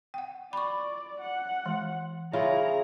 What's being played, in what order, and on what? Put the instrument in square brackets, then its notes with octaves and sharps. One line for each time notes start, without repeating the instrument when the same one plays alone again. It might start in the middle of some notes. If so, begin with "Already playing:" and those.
[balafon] F#5 G5
[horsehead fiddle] D5 [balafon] B5 C#6
[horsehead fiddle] F#5
[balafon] E3 G#3
[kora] C#3 E4 F4 [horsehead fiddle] G#4 A#5